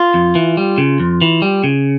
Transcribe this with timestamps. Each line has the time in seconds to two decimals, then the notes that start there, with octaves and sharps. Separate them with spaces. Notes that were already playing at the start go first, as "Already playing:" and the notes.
Already playing: F4
0.14 F2
0.35 E3
0.57 G3
0.78 C#3
1.00 F2
1.22 E3
1.42 G3
1.64 C#3